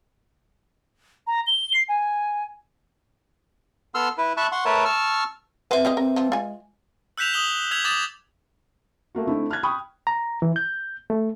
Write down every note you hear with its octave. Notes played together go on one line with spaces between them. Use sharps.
A#5
G7
C7
G#5
B3 A4 C6 E6 F6
E4 B4
E5 A5 B5 C#6 F#6
F#5 C6 C#6
A3 A#4 B4 C#5 E5 A5
A5 C#6 E6 F6
C4 B4 C5 E5 F#5
F4 G4 D#5
C4 A#4
F3
G#3 F4 G#5
E6 F#6 G6 B6 E7 F7
D#6 F#7 G7
E6 G#6 B6 F7 F#7
D6 D#6 A6 E7 F#7
A3 A#3 F#4
D3 A3 C4 D#4 E4
F6 F#6 G#6
G5 B5 C#6 D#6
A#5
E3
G6
A3